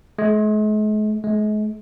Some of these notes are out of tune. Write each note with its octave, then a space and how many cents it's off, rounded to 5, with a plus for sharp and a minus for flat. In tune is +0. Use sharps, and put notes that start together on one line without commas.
G#3 +45
G#3 +40